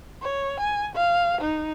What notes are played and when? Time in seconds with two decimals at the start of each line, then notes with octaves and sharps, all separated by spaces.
0.22 C#5
0.60 G#5
0.96 F5
1.41 D#4